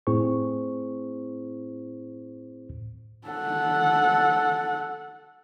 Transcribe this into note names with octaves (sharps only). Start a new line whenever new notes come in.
A2 C4 E4 G#4 C5 C#6
A4 F#5